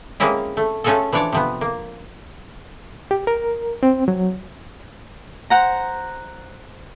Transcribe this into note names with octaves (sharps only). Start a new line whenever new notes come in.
G#3 A#3 C4 C#4 E4 F4
A3
A3 C#4 F4 F#4 G#4 A4
E3 F3 D4 C#5 D5
C3 F3 B3
A#3
G4
A#4
C4
F#3
C5 F#5 A#5